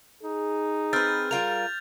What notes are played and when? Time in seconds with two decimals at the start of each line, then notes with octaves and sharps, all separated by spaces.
0.23 D#4 G#4
0.93 C4 B4 F6 G6 A6
1.31 G3 F4 A#4 F7